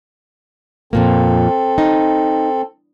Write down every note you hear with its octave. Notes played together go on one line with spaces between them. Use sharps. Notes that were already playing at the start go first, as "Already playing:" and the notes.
F2 A#2 A#3 C4 A4
D#4